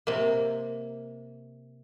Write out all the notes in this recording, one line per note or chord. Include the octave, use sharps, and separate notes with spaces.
C3 A#3